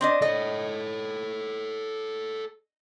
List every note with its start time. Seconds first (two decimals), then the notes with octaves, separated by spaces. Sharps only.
0.01 C4 D4 D#5
0.22 A4 C#5 D#5